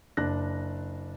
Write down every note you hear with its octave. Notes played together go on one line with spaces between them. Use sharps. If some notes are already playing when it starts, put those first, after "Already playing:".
F#1 D4 F#6 A#6